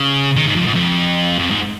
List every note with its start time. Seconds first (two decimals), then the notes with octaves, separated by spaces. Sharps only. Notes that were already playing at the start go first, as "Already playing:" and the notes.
Already playing: C#3
0.37 D#3
0.47 G#2
0.56 F2
0.66 G#2
0.75 F2
1.39 F2
1.51 G#2